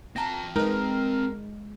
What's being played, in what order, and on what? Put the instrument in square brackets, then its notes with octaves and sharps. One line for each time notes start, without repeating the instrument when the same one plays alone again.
[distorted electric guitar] C4 A5 [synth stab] A#5 A#6
[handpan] G#3 [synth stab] D#4 B4 [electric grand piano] A#4